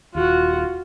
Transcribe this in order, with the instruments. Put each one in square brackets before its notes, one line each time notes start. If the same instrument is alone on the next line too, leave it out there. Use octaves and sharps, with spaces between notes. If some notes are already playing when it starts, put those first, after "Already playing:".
[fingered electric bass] D#1 D#2 [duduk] F4 [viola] F#4